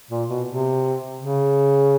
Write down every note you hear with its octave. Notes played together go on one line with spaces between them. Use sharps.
A#2
B2
C3
C#3